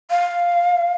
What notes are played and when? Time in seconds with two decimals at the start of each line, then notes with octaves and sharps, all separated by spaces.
0.10 F5